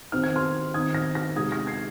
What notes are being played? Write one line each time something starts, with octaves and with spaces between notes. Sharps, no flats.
D#3 C4 D#4 F6
G#6
C6 F6
D#3 C4 D#4 D#6 G#6
F6 A#6
F6 A#6
C3 G#3 D#4 D#6 G#6
F6 A#6
G#6 C7